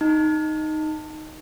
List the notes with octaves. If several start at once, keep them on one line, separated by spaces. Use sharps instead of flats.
D#4